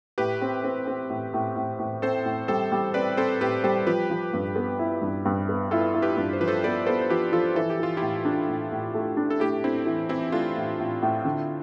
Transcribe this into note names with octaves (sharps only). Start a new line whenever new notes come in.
A2 G4 B4
C4
C4
C4
A2
A2
A2
A2
C4 A4 C5
A2
G3 A4 C5
G3
C4 B4 D5
C4 A4 C5
A2 G4 B4
G3 A4 C5
F3 G4 B4
F3
G2
B3
E4
G2
G2
B3
E4 F4 A4
E4
G4 B4
G2
C5
F3 B4
A4 C5
B3 B4 D5
B3 A4 C5
C5
F3 G4 B4
F3 F4 A4
E3 A4
G4
E3 F4
A2 E4 G4
D4
A2
A2
A3
D4
A4
A3 E4 G4
C4 D4 E4
E3
E3 C4 E4
A3 D4 F4
A2
A2
A2
D3